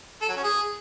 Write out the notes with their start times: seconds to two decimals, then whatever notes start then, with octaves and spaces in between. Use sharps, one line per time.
0.22 A4
0.29 F#3
0.36 C#4
0.44 G#4